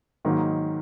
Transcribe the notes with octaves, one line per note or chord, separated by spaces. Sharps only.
G#2 D#3 F#3 A#3 D#4